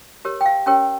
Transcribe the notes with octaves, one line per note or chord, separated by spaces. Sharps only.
G4 A#4 C#5
G5
F5
C#4 G4 A#4 C#5 G5